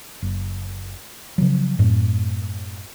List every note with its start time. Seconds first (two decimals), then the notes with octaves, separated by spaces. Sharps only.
0.22 F#1
1.38 C#3 F3 F#3
1.79 F#2 A2 A3 C4